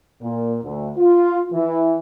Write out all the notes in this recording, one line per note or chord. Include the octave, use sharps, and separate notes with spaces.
A#2
D2
F4
E3